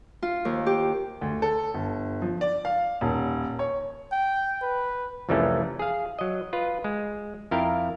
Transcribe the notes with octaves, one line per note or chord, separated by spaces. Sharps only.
F4
D#2
G4
D2
A4
G1
F3
D5
F5
D#1
C#5
G5
B4
C2 F2 E3 G3 A3 C#4
G#4 F5
F#3 D#5
F4 B4
G#3
F2 E4 A#4 F5 G5